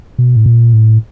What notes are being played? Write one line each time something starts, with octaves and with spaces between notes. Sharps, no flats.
B2
A2
A#2
A2